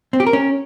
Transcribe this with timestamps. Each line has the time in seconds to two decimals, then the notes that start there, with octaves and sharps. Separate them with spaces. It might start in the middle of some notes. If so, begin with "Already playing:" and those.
0.13 C4
0.20 G4
0.27 A#4
0.33 C#4